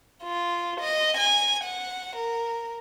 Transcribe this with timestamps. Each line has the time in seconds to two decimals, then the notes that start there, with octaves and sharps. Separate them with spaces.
0.23 F4
0.80 D#5
1.17 G#5
1.64 F#5
2.15 A#4